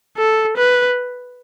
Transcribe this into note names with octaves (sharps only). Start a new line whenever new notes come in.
A4
B4